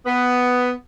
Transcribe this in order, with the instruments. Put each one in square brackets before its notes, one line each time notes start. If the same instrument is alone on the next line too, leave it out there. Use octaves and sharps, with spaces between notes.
[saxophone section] B3